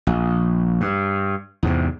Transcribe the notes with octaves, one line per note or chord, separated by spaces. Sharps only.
A#1
G2
E2 G#2 C3